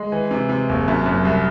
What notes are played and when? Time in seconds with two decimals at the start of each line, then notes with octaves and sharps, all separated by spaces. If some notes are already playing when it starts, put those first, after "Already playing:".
Already playing: G#3
0.12 E3
0.31 C3
0.49 C3
0.69 F#1
0.88 F#2
1.06 F#2
1.25 C2